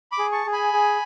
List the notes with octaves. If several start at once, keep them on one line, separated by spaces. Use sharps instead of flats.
B5 D6
G#4
A5 C#6
G#4
G#5 B5
G#4